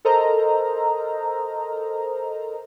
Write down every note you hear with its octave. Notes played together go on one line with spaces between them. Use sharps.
A4 A#4 C5 D#5 A#5